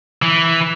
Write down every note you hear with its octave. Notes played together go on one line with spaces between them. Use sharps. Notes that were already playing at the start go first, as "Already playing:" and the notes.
E3